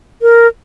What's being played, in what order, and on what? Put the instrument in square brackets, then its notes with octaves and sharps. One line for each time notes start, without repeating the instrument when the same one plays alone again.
[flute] A#4